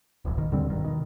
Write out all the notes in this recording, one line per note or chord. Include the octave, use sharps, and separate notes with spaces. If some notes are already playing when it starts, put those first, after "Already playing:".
D#1 A1 F2
G#1 B2 D#3
D#2 D3 G3 C4
G#1 G2 D#3
B2 D#3